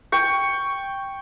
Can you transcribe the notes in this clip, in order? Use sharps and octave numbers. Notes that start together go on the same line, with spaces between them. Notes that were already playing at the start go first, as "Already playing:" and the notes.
G5 C#6